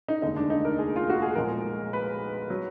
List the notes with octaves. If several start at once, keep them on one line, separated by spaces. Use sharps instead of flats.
D#4
F1 D#2 D3 G#3 D#4
D4
D#4
A#4
G#4
F4
F#4
G#4
B1 A#2 F3 G#3 A#4
B4
F#3